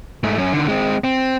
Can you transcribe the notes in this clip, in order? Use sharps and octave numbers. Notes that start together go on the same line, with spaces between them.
G#2 A3
F#2 C#4
D3 D#3
G#3 C4
C4